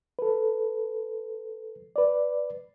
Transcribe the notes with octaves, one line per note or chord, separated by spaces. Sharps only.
A4 B4
B4 D5